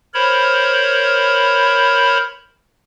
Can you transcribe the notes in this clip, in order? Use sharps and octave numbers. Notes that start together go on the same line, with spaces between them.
A#4 C5 C#5 B5